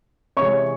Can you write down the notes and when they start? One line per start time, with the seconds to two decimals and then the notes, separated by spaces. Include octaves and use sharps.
0.37 C3 E3 G#3 C#5 C#6